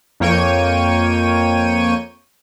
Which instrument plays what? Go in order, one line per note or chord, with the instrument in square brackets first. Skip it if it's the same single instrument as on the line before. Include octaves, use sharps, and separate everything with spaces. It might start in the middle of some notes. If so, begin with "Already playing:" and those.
[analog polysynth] F2 A#3 C#5 G5 C#6 D#7